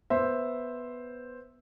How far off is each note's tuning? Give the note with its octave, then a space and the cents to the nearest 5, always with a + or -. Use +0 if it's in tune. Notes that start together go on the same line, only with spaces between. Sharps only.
B3 +0 C5 +5 E5 +0